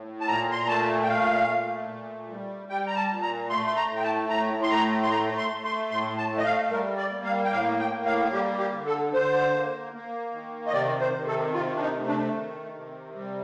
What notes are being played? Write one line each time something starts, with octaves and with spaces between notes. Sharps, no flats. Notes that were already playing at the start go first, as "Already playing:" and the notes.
Already playing: A2
A5
A#2 A#5
C6
A#5
A3 A5
G5
A#2 F5
A3
A#2
G3
G3 G5
A#5
A5
A#2
A#5
A3 C6
C6
A#5
A2
G5
A5
A2 A#5
C6
A3 A#5
C6
A3 A#5
C6
A3
C6
A2 C6
A5
A3
D#5
F5
G3 A#4
D5
A#3
F5
G5
A2 F5
G5
A#3
F5
G3 G4
G4
D3
A4
D3 C5
A#3
A#3
D#3
D#5
C3 D5
C5
D#3
A4
C3 F4
D4
D#4
A3
D4
D#3
C3
G3